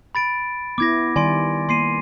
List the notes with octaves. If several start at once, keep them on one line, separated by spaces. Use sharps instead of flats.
B5 A6 D7
B3 E4 D6 G#6 A#6
D#3 G3 D5 G#5 C6 D7
A#3 C6 C7 D#7